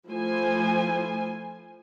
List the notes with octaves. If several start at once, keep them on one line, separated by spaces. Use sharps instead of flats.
F3 A3 E4 C5 G#5